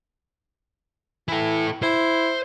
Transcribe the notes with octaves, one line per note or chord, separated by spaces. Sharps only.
E3 E4 A4
E4 C5